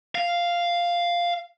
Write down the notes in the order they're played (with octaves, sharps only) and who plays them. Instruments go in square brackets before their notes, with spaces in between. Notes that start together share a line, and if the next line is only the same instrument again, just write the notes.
[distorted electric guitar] F5